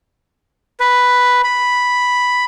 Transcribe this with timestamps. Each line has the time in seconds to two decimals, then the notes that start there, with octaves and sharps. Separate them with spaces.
0.80 B4
1.44 B5